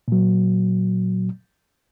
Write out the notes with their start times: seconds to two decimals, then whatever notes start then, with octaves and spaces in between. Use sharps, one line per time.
0.08 A#2 F#3